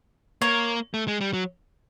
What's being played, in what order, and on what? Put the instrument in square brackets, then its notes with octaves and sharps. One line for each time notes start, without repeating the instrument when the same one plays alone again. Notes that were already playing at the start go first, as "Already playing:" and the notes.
[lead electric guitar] A#3 [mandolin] C#5
[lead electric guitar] A3
G#3
G3
F#3